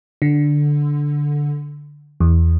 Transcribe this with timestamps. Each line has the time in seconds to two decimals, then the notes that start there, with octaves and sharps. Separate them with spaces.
0.22 D3
2.20 E2